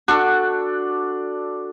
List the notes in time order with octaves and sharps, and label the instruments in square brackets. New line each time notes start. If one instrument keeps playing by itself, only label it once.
[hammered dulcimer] D4 A4 [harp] F#4